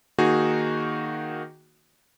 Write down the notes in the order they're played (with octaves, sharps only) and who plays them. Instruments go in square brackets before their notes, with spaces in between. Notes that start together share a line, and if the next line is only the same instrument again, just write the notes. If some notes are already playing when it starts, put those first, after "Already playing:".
[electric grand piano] D#3 A#3 D#4 F#4 G#4